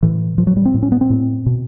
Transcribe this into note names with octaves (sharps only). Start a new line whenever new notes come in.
A2 E3
A2 F3
F#3
G3
C4
A2
C#4
B3
C4
A2
B2